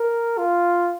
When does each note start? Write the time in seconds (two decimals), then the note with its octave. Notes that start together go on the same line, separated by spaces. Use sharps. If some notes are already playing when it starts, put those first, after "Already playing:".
Already playing: A#4
0.38 F4